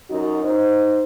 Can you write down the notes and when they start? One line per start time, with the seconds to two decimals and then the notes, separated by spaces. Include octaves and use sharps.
0.11 F#2 D#4 F#4
0.45 D#4 C5